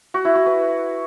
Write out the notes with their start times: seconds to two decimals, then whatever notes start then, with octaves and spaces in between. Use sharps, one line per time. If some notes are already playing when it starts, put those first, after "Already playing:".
0.14 F#4
0.25 E4
0.36 F#4
0.46 B4